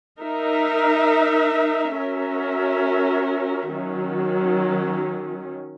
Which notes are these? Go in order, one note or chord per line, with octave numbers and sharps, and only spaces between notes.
D#4 A#4 E5
C#4 F#4 A#4 E5
D#3 F#3 C#4